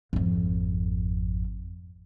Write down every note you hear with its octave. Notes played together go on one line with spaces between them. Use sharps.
G#1 F2